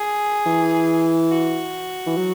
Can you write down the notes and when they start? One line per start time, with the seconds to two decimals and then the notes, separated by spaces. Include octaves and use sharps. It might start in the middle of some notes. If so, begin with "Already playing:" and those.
Already playing: G#4
0.46 E3
1.31 F#4
2.06 E3
2.17 F#3